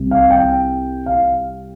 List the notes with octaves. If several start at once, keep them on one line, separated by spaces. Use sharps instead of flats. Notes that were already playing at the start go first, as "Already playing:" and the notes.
Already playing: C2 C3 G3
F5
G5
F5